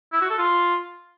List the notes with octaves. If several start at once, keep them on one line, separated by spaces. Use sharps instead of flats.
E4
F#4
A4
F4